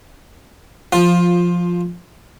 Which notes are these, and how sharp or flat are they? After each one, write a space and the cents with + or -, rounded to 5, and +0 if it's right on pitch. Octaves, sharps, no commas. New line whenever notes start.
F3 +0 F4 +15